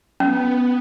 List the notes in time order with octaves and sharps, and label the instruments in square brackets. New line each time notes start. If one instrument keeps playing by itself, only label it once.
[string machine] B3 [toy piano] C#4